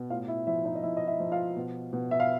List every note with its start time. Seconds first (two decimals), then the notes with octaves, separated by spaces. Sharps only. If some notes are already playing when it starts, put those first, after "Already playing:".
Already playing: B2
0.10 A2 F4 F5
0.28 E4 E5
0.47 F3 E4 E5
0.65 D#4 D#5
0.76 D#5
0.83 F3 E4 E5
0.97 D#5
1.07 E4 E5
1.20 F3
1.32 F4 F5
1.56 B2
1.93 B2
2.11 E5
2.20 F5